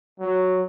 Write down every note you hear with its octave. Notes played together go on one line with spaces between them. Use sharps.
F#3